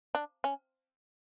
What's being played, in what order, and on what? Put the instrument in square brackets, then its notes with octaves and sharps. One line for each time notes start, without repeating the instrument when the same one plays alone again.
[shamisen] D4
C#4